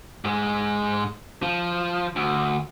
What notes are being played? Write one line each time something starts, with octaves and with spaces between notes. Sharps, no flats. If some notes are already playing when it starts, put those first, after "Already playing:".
G#2 G#3
F3
D2